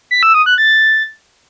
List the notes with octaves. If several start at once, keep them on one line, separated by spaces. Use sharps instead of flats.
B6
E6
D#6
F#6
A6